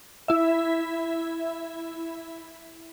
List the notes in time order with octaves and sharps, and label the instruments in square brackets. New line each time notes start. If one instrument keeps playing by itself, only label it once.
[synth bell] E4 E5